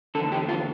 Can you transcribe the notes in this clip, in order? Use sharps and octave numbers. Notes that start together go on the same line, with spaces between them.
E2 D3 A4
G4
F4